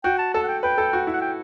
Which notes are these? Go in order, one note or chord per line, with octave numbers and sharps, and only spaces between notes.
F#4 G5
A5
A4 A5
F#5
G5
B4 G5
A4
F#4
E4
F#5
G5